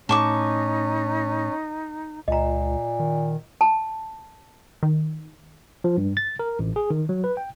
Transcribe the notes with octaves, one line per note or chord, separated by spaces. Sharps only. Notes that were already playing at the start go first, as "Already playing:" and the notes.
A2 C#4 D#4 A5 C#6 D6
C#2 A#2 D#5 A#5
D#3
A5
D#3
F3
G2
A6
A#4
A1
G#4
D#3
F#3
B4
G5